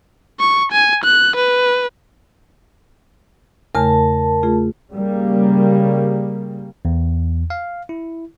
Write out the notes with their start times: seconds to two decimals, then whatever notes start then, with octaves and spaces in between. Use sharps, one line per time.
0.40 C#6
0.72 G#5
1.04 F#6
1.36 B4
3.75 E2 C#3 A3 A#4 A5
4.43 A3 F4 G#4
4.92 C#3 G3 A#3
6.85 E2
7.50 F5
7.89 E4